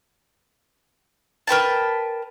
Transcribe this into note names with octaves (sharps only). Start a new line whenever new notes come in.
A#4 B4 G5 A5